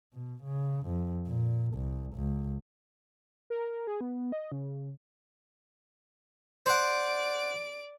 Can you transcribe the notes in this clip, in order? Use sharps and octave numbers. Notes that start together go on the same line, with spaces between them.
B2
C#3
F2
A#2
C2
C#2
A#4
G#4
B3
D#5
C#3
C5 D5 F#5 D7